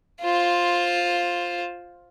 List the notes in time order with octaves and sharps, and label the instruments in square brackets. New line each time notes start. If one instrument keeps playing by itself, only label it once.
[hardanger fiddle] F4 C5